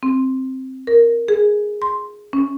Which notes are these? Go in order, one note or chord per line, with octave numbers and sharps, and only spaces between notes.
C4
A#4
G#4
C6
C#4